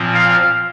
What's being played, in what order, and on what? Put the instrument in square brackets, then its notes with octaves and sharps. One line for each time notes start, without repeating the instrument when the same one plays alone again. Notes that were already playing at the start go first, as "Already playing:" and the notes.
Already playing: [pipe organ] A#2 F3 C4
[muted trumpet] F5